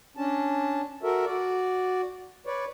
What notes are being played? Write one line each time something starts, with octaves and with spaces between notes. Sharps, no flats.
C#4 D4 A5
F#4 A4 A#4 E5
F#4 D5
B4 C#5 D5